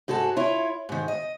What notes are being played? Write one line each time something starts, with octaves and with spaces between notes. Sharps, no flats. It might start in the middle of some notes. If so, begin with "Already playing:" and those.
G#2 F#4 G#4 A4 A5
E4 F4 C#5
G#2 D#3
D#5